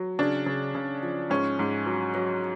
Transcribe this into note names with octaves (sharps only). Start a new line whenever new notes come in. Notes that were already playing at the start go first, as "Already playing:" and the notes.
Already playing: F#3
C#3 D4
C#3
C#3
F3
G#2 C#4
G#2
F#3
F#3